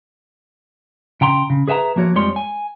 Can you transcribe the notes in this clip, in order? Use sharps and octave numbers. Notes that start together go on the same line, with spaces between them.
C#3 G5 A#5 C6
C#3
G#4 B4 E5 G5 A#5
F3 A#3 F#4 C#5
F2 F3 G3 G#3 C#5 C6
G#5